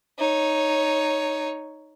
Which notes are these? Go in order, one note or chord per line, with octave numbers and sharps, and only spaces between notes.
D#4 C#5